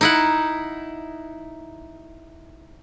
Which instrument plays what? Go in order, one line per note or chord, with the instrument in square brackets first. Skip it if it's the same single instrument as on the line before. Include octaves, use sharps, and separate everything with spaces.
[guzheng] D#4 E4 F#5